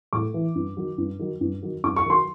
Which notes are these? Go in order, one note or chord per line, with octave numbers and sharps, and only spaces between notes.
A2 D6
E3
G2
D#3 F#3
G2
D#3 F#3
G2
D#3 F#3
G2 D6
C#6
D#3 F#3 C6